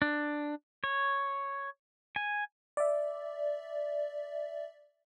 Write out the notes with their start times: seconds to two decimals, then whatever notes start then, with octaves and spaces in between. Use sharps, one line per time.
0.02 D4
0.84 C#5
2.16 G#5
2.77 D5 E5